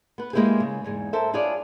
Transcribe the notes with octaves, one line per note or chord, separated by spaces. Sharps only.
B3 B4
G#3 A#3 E4 F4 G4 G#4
C#3
E2 G#2 G#4
A4 A#4 C5 E5
D4 E4 F4 G#4 C#5 D5